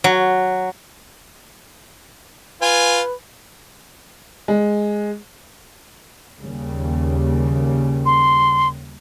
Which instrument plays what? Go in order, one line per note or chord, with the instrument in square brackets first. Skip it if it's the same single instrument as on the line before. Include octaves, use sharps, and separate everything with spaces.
[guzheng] F#3
[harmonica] F4 G#5 [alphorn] B4
[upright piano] G#3
[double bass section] D#2 C#3 G3
[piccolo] C6